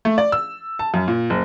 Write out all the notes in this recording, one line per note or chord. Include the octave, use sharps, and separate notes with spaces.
A3
D5
E6
A5
F#2
A#2
F#1